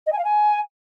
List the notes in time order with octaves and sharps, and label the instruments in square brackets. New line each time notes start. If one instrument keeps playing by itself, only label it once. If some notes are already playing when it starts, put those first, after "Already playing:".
[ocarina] D#5
G#5
F5
G#5